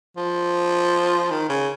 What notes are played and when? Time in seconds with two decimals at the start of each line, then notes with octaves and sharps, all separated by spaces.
0.17 F3
1.31 D#3
1.49 C#3